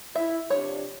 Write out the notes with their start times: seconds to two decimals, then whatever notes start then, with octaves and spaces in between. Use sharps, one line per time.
0.15 E4 E5
0.50 C3 F3 D4 C#5